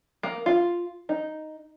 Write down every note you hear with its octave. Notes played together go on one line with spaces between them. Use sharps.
A#3
F4
D#4